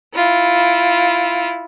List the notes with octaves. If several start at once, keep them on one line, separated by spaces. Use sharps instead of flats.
E4 F4